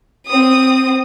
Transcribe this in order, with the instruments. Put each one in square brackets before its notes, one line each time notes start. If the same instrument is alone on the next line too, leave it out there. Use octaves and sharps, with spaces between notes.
[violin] C4 D#6